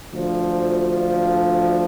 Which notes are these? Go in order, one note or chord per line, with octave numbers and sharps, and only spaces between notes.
D2 D3 F3